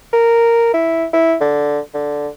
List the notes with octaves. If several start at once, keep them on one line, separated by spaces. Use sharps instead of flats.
A#4
E4
E4
D3
D3